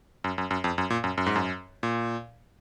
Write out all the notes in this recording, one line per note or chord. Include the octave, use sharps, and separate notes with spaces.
F#2
F#2
F#2
F2
F#2
A#2
F#2
F#2
G#2
F#2
A#2